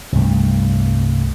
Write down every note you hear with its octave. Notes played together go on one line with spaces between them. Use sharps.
C2 G2 A3